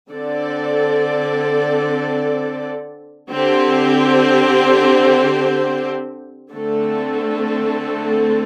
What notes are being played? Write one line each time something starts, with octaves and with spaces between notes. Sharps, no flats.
D3 C4 A4 D5
D3 C4 G4 C5
D3 A3 C4 A4